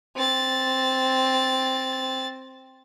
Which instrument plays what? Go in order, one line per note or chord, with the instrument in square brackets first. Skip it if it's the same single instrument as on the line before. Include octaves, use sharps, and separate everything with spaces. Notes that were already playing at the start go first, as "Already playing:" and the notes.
[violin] C4 A6